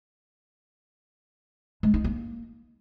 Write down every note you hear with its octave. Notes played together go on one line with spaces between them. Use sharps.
G#3
D#4
A#3